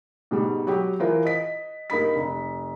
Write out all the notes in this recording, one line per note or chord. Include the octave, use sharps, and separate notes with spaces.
G#2 B2 G3
F#3 G4
E3 F4 A#4 C5
D#5 B6
G2 A#3 D#4 B5 B6
F1